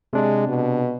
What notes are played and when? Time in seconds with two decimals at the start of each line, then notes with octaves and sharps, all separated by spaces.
0.13 C3 G#3 D4
0.48 B2